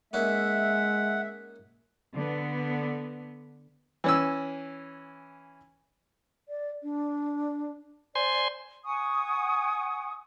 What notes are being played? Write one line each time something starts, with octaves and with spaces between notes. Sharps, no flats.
G#3 A#3 C#4 D#4 E5 F#5
D3 B3
E3 C#4 E6
D5
D4
C5 D5 G#5 C6
F#5 G#5 C#6 D#6